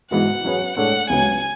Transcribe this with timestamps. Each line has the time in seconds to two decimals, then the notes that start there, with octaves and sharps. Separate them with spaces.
0.11 G#2 E3 G#3 B3 F#4 F#5
0.44 F#3 C#4 G#4 B4
0.77 A2 G#3 D4 A4 C#5 F#5
1.09 C#2 C#3 F#3 B3 G#5